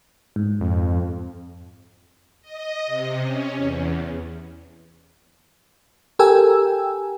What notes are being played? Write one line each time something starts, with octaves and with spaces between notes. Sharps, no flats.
G#2
F2
D#5
C3
C#4
E2
G4 A4 A#4 G5 G#5 E6